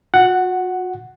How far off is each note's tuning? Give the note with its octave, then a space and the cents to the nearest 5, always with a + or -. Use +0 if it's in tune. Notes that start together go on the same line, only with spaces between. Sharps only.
F#4 -40 F#5 +5